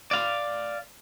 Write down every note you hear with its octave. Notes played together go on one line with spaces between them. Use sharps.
D5 F5